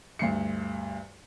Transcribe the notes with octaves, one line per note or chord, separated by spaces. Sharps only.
D2 G2 C7 C#7